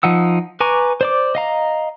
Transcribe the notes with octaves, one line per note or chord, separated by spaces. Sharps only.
F3 D#4 F#5 E6
B4 G#5 A#5 C#6 D6
C5 D5 D6
D#5 F5 A#5